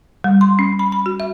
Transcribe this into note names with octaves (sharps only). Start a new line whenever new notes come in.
G3
C6
C#4
B5
B5
F#4
E5